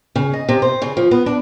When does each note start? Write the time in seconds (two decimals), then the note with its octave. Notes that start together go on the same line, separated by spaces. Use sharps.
0.16 C#3
0.33 D#5
0.49 C3
0.62 C5
0.82 C#3
0.97 F3
1.11 B3
1.26 D4